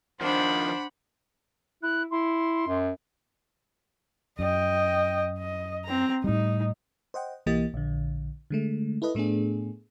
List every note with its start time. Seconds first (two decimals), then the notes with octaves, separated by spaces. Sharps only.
0.21 D#3 F3 D4 C5 F#5 B5
1.83 E4 F#6
2.11 E4 C6
2.68 F#2
4.39 F#2 D#5 G5
5.39 D#5
5.85 C4 A#5
6.24 A2 G3 D#4
7.14 C5 D#5 F#5 G5
7.46 B1 E3 A#3 G4 D#5 A6
7.74 A#1 D3
8.50 D3 G#3 A3
9.02 E4 A4 B4 D#5
9.15 A2 A3 B3 D4 G#4